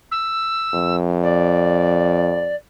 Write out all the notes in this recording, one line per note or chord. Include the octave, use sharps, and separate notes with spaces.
E6
F2
D5